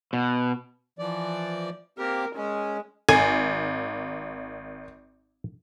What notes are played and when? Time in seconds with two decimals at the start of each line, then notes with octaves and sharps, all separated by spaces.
0.13 B2
0.99 E3 F3 D5
1.98 A#3 C4 G4 A#4
2.36 G#3 C#4
3.09 G#1 G#5